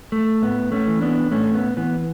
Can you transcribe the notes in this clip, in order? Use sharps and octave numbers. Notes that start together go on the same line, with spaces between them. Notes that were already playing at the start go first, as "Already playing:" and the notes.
A3
A2 B3
A3 C#4
E3
B3 D4
A2 A3 C#4
B3
E3 B3